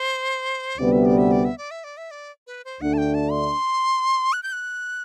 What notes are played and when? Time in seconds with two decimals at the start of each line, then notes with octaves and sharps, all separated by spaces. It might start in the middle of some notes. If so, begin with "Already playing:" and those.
Already playing: C5
0.78 D2 C3 G3 B3 D5
0.92 E5
1.06 D5
1.18 E5
1.32 D5
1.45 E5
1.58 D5
1.71 E5
1.84 D5
1.97 E5
2.11 D5
2.47 B4
2.65 C5
2.81 D2 D3 A3 D4 F#5
2.94 A5
2.98 G5
3.14 A5
3.31 C6
4.33 F#6
4.43 G6
4.52 F#6